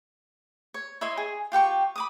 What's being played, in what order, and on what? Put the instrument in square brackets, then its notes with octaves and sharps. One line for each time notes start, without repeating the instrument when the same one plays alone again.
[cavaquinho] C#5
E4 C#5 D#5 C6
G#4
F4 G4 G5 C#6
B5 D6 D#6